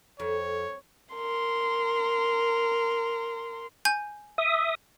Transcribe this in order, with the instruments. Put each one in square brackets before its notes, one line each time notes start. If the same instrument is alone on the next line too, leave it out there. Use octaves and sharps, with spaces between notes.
[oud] F2 [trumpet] C#5
[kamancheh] A#4 C6
[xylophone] G#5 G6
[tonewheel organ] E5 D#6